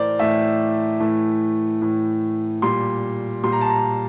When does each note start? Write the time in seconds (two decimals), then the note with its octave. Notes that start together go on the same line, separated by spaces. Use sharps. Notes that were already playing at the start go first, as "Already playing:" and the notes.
Already playing: A2 E3 A3 A#4 C5 D5
0.19 A2 E3 A3 E5
1.00 A2 E3 A3
1.81 A2 E3 A3
2.62 A#2 G3 C6
3.44 A#2 G3 C6
3.52 A#5
3.61 A5
3.70 A#5